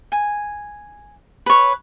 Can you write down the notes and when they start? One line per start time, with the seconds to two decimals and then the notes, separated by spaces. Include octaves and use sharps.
0.12 G#5
1.46 B4 C#5